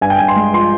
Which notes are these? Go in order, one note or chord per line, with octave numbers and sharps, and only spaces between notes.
G2 G#5
G5
G2 G#5
C6
G#3
F3 C6